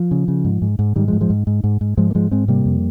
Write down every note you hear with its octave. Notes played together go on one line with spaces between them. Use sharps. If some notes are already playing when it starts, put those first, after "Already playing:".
Already playing: F3
C#3
C#3
G#2
G#2
G#2
G#2 D#3 G3
F3 G#3
G#2
F3 G#3
G#2
G#2
G#2
G#2
G#2 F3 G#3
A#3
G#2 F3 G#3
G#2 G#3 C4
C3 G3 A#3
F2